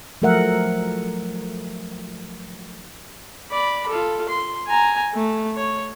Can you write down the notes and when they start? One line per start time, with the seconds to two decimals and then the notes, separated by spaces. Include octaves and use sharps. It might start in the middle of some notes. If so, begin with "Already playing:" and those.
0.22 F3 F#3 A3 A#4 E5 F#5
3.51 D5 B5
3.88 F4 A4
4.29 C6
4.67 G#5 A#5
5.14 A3
5.56 C#5